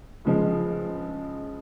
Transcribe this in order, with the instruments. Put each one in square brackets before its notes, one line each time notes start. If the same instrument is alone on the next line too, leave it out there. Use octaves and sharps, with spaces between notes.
[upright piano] C#2 C#3 F3 G#3